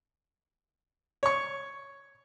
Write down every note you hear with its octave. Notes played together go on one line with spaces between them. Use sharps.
C#5 C#6